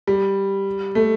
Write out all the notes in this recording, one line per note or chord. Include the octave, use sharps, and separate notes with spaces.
G3
A3